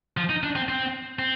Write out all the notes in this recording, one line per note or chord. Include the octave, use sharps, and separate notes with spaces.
F3
D#4
D4
C4
C4
C4